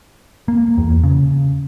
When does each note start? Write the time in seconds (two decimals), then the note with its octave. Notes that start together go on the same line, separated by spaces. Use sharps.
0.48 A#3
0.78 E2
1.04 C#3